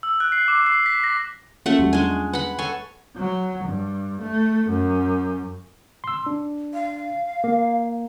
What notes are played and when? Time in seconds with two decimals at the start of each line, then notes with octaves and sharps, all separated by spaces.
0.03 E6
0.20 F#6
0.32 C7
0.48 D6
0.66 C7
0.86 B6
1.04 A#6
1.66 A3 A#3 C#4 F4 F#5
1.78 E2 F#3 G3
1.93 G#3 D4 G#5
2.33 B4 F#5 B5
2.59 A4 C#5 G#5
3.17 F#3
3.65 G2
4.22 A3
4.70 F#2
6.04 C6 E6
6.26 D4
6.74 F5
7.44 A#3